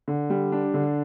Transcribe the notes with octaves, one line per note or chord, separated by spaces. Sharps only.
D3
G3
D4
D3